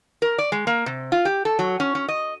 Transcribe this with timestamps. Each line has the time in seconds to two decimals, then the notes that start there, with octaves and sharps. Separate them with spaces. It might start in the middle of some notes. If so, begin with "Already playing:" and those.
0.22 A#4
0.38 D5
0.52 G#3
0.67 A#3
0.86 C3
1.12 F4
1.25 G4
1.45 A4
1.59 F#3
1.80 C#4
1.95 C#4
2.08 D#5